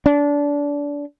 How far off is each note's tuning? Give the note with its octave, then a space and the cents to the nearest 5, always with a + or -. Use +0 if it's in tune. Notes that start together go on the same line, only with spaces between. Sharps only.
D4 -25